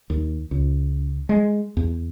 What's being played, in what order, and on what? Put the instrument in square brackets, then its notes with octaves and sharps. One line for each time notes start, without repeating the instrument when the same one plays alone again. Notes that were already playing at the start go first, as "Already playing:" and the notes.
[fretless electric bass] D#2
C#2
G#3
E2